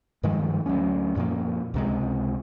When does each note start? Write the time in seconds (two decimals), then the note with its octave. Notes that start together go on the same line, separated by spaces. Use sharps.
0.23 G2 D#3 F3 G#3
0.66 D2 F#3 G#3 C#4
1.16 F#2 A#2 F3 A#3
1.74 C#2 C3 G#3